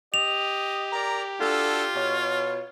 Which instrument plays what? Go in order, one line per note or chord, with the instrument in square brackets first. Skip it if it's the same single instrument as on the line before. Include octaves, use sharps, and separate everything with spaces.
[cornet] G4 [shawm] D#5 [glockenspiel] F7
[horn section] A#4 D5 A#5
[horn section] D4 F#4 A4 [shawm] F4
[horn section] B2 C#5